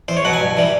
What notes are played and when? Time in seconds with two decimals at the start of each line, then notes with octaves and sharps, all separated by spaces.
0.08 E2 C5
0.17 C#5
0.25 B2 F#3 F#5
0.33 G#5
0.40 G2
0.57 E3 G3